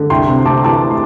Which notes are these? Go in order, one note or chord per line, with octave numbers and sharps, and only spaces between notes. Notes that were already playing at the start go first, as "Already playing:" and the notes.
Already playing: D3
C2 G5 C6
C3
C4 A5 D6
E3 A5 D6
C6